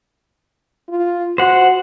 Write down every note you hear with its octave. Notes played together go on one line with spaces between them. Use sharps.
F4
F#4 C5 F#5